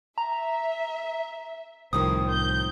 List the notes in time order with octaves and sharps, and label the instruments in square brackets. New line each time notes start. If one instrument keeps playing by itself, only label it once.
[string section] E5 [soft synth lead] A#5
[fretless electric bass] C2 [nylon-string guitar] A2 D#3 F3 [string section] C4 [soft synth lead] D#6
[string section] G6